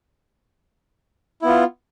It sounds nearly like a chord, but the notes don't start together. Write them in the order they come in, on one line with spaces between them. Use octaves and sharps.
E4 B3 F4